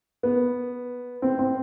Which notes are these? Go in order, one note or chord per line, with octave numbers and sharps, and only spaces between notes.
B3
C4
C4